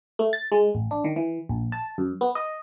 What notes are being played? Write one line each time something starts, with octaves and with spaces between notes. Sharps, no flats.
A3
A6
G#3
A1
D4
D#3
E3
A#1
A5
F#2
B3
D#5